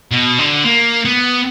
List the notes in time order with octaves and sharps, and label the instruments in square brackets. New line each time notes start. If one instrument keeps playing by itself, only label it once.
[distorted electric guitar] B2
D3
A#3
B3